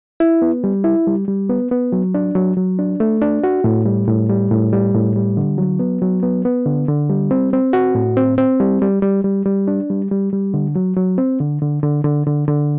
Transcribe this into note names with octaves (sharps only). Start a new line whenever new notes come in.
E4
B3
G3
E4
G3
G3
B3
B3
F#3
D4
F#3
F#3
D4
A3
D4
F#4
A2
G3
A2
G3
A2
G3
A2
G3
D3
F#3
B3
F#3
B3
B3
D3
D3
G3
C4
C4
F#4
A2
C4
C4
G3
G3
G3
G3
G3
D4
G3
G3
G3
D3
F#3
F#3
C4
D3
D3
D3
D3
D3
D3